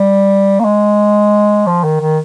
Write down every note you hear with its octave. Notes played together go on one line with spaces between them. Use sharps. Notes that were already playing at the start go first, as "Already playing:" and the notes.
Already playing: G3
A#3
G#3
F3
D#3
D#3